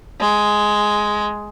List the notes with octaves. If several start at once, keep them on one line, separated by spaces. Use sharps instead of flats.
G#3